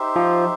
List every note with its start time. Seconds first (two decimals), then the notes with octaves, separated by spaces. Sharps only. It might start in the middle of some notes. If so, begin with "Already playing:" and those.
Already playing: D#4 G4 C5 E5
0.16 F3